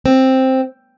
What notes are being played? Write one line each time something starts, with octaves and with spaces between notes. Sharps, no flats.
C4